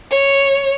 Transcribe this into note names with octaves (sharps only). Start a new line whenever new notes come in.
C#5